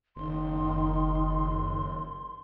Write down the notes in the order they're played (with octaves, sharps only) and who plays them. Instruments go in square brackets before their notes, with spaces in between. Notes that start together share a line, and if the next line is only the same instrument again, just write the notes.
[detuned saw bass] F#1 [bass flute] D#3 [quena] C6